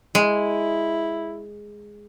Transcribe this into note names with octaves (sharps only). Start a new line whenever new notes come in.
G#3 E4